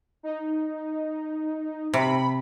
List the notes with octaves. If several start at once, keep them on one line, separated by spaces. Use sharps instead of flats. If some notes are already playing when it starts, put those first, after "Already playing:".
D#4
C3 B5